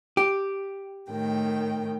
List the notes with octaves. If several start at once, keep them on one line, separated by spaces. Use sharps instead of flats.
G4
A2 D#3 G5